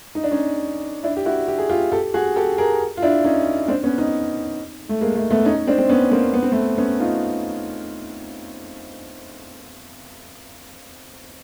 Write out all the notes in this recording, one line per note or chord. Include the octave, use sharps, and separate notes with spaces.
D#4
D4
C#4 D#4
D4 E4
G4
E4 F#4
G4
G#4
F4 G4
G4 A4
F#4 G#4
G4 A4
G#4 A#4
F4
D4 E4
C#4 D#4
C4 D4
B3 C#4
C#4 D#4
A3
G#3 A#3
A3
A3 B3
C#4 D#4
C4 D4
C4
B3 C#4
A#3 C4
B3
C4
A3 B3
B3 C#4
D#4 F4